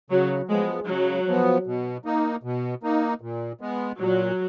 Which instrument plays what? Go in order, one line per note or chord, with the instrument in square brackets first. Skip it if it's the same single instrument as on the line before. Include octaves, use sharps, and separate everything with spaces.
[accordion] C#3 [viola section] F#3
[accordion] F3 B3 [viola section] G#3
[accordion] C#3 [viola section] F#3
[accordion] F3 B3
B2
A#3 D#4
B2
A#3 D#4
A#2
G#3 B3
[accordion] A#2 [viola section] F#3